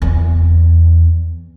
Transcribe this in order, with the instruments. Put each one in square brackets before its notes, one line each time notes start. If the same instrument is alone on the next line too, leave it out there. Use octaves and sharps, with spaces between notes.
[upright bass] E2